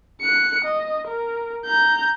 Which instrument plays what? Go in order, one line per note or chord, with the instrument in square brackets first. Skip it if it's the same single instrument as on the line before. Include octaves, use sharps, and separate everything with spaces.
[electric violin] F#6 C#7
D#5
A#4
A#5 G6